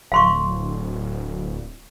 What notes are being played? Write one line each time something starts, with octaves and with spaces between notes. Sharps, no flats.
D1 F5 C6 C#6